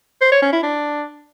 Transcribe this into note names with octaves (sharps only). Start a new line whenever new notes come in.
C5
C#5
C#4
E4
D4